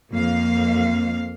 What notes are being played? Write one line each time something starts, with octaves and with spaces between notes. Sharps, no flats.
F2 A#3 F5